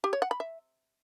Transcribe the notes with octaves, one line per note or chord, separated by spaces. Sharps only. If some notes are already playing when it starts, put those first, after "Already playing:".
G4
C#5
F#5
B5
E5